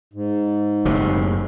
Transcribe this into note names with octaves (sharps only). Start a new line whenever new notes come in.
G#2
F#1 A2 C3